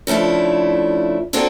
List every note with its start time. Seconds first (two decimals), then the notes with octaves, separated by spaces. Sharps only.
0.07 C#3 F3 A3 D4 E4
1.33 A#3 C4 D4 F4 F#4 A4